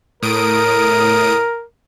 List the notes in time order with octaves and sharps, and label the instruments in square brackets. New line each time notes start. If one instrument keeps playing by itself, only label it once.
[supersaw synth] A2 D#6 D7 [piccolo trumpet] A#4